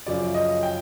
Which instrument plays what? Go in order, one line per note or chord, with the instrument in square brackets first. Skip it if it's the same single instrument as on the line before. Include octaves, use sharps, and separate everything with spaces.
[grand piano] F#2 C#3 F3 D5
D#5
G5